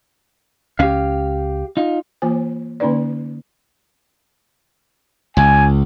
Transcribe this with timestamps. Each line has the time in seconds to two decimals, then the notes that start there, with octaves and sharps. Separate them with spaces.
0.79 C#2 C#4 G4 F5
1.77 D#4 F4
2.22 E3 A#3 F4 C5 G#5
2.80 D3 A#3 C#4 D#4 B4 D5
5.37 C#2 G#5